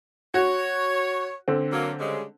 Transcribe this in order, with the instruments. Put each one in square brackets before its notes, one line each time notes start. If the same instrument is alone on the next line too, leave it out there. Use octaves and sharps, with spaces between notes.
[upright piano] F#4 [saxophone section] C#5
[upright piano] D3 C4
[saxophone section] F#3 A#3
C#3 G3 G#3